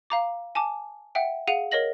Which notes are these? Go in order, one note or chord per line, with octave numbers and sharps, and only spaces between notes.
F5 A#5 D6
G#5 A5 D6
E5 F#5 G5
G#4 F5 F#5 D#7 F7
A#4 C#5 D#5 A#6 F#7